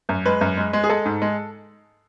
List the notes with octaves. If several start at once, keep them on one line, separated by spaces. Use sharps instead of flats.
F#2
G#3 B4
F#2
G#3
G#3
G#4
G#3 A4
G#2
G#3